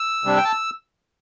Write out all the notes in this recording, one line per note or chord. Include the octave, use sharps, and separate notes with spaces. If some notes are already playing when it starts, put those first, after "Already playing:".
Already playing: E6
C3 G3 D4
G5
A5